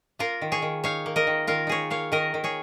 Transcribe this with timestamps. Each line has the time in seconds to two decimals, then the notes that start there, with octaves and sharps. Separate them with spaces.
0.19 A#3 F4 A#4
0.42 D#3
0.52 G#4 C#5
0.62 D#3
0.84 D#4 C#5 F5
1.06 A#3
1.16 A#4 D#5
1.27 D#3
1.47 D#3 F4 A#4
1.67 D#4 G#4 C#5
1.90 A#3 C#5 F5
2.12 D#3 A#4 D#5
2.34 D#3
2.44 G#4 C#5